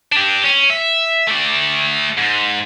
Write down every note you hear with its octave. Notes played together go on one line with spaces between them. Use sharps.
D4 G4
C#4
E5
A3 D5
G#2